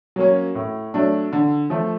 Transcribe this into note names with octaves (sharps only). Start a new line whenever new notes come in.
F#3 A#3 C#4
A2
F#3 A3 D4
D3
F3 A3